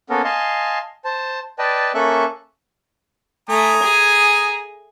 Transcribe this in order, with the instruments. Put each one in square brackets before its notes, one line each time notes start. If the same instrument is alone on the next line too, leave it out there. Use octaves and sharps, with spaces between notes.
[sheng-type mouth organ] A#3 B3 C#4 A4 A#4
D#5 F5 G#5 A5 C6
C5 A5
B4 D5 D#5 G5 A5
A#3 C#4 A4 E5 C#6 F#6
[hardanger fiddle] A3 [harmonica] G#5 A#5 D#6
[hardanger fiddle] G#4